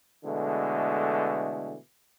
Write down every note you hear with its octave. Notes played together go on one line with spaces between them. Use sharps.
B2 D3 E3 G#3 A3